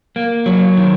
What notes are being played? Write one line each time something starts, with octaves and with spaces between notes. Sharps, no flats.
A#3
F#3
D#3